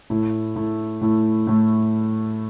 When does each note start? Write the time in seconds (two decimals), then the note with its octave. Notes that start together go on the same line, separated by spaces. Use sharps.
0.10 A2 A3 E4
0.55 A2 A3 E4
1.01 A2 A3 E4
1.47 A2 A3 E4